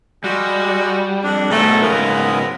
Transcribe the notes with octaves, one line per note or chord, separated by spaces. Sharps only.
G3 G#3 F#4
F2 D4
G#2 B2 D#3 F#3 A3
G#2 C#3 F#3 G#3 B3 A#4